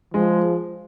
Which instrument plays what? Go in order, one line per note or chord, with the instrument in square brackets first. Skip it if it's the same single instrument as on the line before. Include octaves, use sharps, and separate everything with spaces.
[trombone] F3 [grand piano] G#3